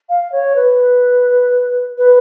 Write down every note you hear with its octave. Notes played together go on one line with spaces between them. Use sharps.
F5
C#5
B4
B4